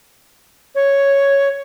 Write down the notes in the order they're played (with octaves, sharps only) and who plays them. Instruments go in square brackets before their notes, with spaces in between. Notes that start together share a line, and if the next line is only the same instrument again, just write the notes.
[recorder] C#5